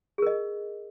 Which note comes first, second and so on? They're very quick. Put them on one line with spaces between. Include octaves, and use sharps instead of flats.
G#4 A#4 D#5